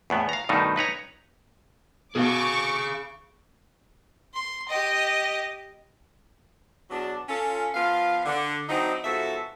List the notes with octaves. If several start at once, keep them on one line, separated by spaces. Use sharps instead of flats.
E2 A2 B3
F5 A#5
G2 B2 D#3 A3 D#4
D#4 B4 C#5 A#5
B2 G#4 F5 C#6 D6
C6
G4 D#5
E2 B2 F#3 D4
C#4 F4 A4
F3 B3 F4 F5
D3
E3 F#3 C4 D4 D#4
G#2 B2 F3 F#4 A4 E5